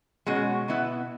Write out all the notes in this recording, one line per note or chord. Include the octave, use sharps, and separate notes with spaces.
B2 G#3 C#4 F#4
B2 B3 E4